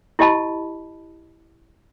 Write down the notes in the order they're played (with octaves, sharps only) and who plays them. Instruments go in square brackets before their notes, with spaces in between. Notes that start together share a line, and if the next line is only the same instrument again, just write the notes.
[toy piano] E4 G4 D#5 A5 B5